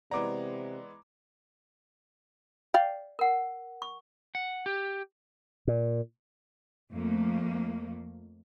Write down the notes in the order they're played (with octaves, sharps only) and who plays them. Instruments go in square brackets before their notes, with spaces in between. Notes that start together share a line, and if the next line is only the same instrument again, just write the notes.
[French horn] C3 [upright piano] E3 G#3 B3 [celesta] D5 [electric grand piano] A#5 D6
[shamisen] D5 F5 G5
[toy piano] A#4 F#5
C#6
[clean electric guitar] F#5
G4
[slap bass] A#2
[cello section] F2 A3 A#3